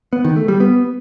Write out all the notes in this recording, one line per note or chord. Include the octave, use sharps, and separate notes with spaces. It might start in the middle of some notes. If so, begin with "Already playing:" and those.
B3
D#3
A3
G3
B3